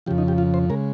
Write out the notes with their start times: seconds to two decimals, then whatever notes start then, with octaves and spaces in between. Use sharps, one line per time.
0.06 F2 C#3 F3 G4
0.18 D#4
0.28 G4
0.38 F4
0.54 C5
0.70 C#3 G#3 A#4